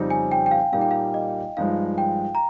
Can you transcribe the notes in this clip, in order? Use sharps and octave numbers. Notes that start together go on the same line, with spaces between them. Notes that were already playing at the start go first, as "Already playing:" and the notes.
Already playing: F2 C#3 G3 C4 D#4
G#5
G5
G5
F5
A#2 G3 A#3 D#4 F5
G5
F5
D#5
G2 F3 G#3 D#4 F5
G5
A#5